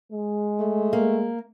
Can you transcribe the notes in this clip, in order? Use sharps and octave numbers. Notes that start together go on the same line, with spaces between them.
G#3
A3
A#3